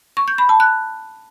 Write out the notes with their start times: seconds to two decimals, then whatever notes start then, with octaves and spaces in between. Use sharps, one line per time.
0.17 C#6
0.28 G6
0.38 B5
0.49 A5
0.60 F#6